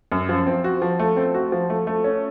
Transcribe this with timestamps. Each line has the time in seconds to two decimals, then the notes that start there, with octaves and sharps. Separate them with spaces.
0.12 F#2
0.29 F3
0.47 C4
0.64 F#4
0.82 F3
0.99 A3
1.17 C4
1.34 F#4
1.52 F3
1.70 A3
1.87 A3
2.04 C#4